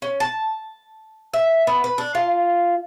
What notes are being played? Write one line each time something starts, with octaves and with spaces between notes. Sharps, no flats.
C#4
A5
E5
B3
B4
D4
F4